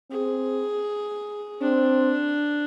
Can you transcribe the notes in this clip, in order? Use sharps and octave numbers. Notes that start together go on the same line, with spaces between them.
C4 G#4
C4 D4